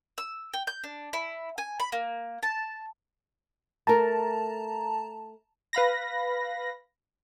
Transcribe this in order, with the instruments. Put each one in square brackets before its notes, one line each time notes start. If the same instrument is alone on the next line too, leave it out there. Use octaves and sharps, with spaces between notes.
[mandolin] E6
G5
G6
D4
E4
G#5
B5
A#3
A5
[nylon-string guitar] A3 A#4 [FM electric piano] A5 A#5
[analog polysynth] B4 F5 B5 A#6